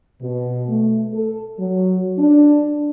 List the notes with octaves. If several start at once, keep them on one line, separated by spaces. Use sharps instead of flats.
B2
A3
A4
F#3
D4